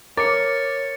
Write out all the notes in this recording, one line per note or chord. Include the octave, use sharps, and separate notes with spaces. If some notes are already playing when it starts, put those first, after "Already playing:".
A#4 C#5 D6 A6 C#7